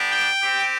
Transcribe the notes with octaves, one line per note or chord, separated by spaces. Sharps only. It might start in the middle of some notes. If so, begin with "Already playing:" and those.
Already playing: B3 D4 G4
G5
C4 G4